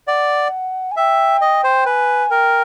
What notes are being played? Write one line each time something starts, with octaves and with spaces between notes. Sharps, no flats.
D5 F#5
G#5
E5 G5
D#5
C5
B4 G#5
A#4 G5